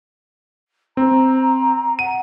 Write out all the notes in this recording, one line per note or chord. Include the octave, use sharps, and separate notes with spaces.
C4 A#5
F#5 D#7